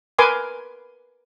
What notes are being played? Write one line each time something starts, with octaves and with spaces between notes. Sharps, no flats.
A#4 B4 G#5 C6 D6